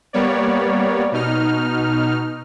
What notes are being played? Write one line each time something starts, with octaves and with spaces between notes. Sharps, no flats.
G3 A#3 B3 C#5 D5
B2 D#4 F6